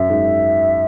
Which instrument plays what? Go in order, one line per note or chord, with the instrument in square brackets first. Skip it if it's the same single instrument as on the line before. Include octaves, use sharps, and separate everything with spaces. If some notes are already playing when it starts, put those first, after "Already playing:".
Already playing: [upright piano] F#2 [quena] E5
[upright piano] G#2